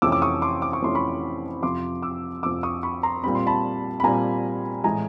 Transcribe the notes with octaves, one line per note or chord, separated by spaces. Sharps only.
F2 C3 E3 A3 C#4 D6 E6
D6
C#6 D#6
C6 D6
D6
C#6
F2 C3 E3 A3 C#4 C6
B5 C#6
F2 C3 F3 C6 D6
D6 E6
F2 C3 F3 D6 E6
C#6 D#6
B5 C#6
A#5 C6
A#2 G3 C4 B5
C6
A5 B5
B5
A#2 G3 C4 G#5 A#5
A2 E3 G#3 G#5 A#5